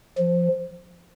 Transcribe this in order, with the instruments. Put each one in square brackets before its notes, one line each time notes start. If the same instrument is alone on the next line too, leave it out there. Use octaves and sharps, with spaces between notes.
[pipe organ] F3